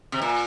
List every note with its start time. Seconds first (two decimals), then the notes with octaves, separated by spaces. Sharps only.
0.12 C3
0.22 A#2